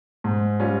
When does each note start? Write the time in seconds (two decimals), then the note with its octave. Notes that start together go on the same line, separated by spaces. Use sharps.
0.24 G#2
0.60 G3 C#4 F4